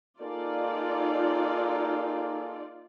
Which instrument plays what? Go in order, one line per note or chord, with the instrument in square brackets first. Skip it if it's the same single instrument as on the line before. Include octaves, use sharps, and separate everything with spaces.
[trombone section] A#3 G#4 A4 [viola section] D#4 F4 D5